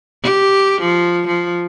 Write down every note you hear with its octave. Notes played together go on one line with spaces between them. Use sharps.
G4
F3
F3